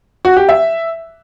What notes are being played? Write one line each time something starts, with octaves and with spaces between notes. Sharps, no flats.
F#4
G4
E5